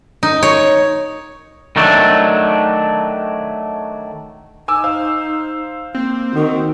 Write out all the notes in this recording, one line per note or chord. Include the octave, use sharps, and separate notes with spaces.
D#4
C#5
D#3 F#3 A3 D4
D#4 G#5 D6 E6
C5 F5
A#3 C4
D#3 F#4